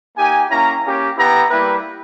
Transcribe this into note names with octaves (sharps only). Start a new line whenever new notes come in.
A#3 D#4 G4 G#5
A#3 C#4 E4 A#5
A#3 C#4 G4
B3 E4 G4 A#5
G3 A#3 E4 G4 B4